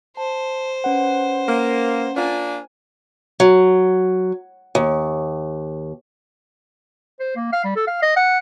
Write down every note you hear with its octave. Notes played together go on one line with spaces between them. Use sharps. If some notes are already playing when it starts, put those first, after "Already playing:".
C5 A5
C#4 B4 F#5
A#3
A#3 D4 F4 G#5
F#3
D#2
C5
A#3
F5
G3
A4
F5
D#5
F#5